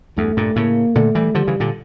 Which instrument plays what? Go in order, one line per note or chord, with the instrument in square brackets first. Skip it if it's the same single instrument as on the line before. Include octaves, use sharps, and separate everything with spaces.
[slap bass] E2 G2 [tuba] A3
[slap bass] G2 A#2
[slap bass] A2 C#3 [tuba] A#3
[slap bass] A#2 D3 [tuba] A3
[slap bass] E3 G3
[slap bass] D3 F3 [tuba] G3
[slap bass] C#3 E3
A#2 D3